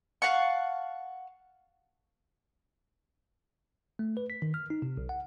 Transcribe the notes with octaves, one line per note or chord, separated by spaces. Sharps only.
F5 F#5 A5 C#6
A3
B4
B6
D#3
F6
D#4
C3
B1
F#5